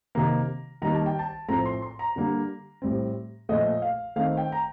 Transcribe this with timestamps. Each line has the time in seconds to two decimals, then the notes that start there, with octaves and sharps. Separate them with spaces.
0.15 C3 D#3 A#3 A#5
0.82 D#3 G3 A#3 A#5
0.95 A5
1.06 G5
1.19 A5
1.48 A2 F3 A3 C4 A#5
1.66 C6
1.82 C6
1.99 A#5
2.16 D3 G3 A#3
2.82 A2 G3 C4
3.49 A#2 F3 A3 D#5
3.82 F5
4.16 D#3 A3 C4 F5
4.37 G5
4.52 A#5